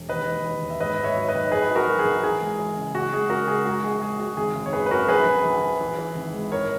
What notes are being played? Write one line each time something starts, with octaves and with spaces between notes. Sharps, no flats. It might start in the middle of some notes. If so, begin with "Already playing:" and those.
Already playing: E1
D#2 B4 D#5
D#2
D#2
D#2
E5
G#2 B4 D#5
G#2 D#5
C#5 E5
F#3
B4 D#5
D#3
A#1 G#4 B4
F#3
F#4 A#4
F#3
G#4
A#1
E3 G#4
G#3
E3
C#3
G#3 F#4
G#3 G#4
C#3 F#4 A#4
G#3 G#4
G#3 F#4
A#1 G#4
G#3 G#4
G#3 F#4
G#1 G#4
G#1
C#5
F#2 G#4 B4
B4
F#2 F#4 A#4
A#1 G#4 B4
A#1
A#1
F#3
E3
E3
G#1
G#3
G#2 A#4 C#5